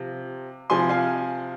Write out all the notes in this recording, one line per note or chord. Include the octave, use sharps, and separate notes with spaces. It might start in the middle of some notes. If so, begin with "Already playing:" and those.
Already playing: C3 F3
C3 F3 G#5 C6
F5 G#5